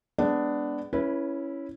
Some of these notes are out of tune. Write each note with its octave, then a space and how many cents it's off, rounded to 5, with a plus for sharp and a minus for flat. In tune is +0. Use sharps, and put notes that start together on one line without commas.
G#3 +0 B3 +20 D4 +0
C#4 +0 E4 +0 B4 -25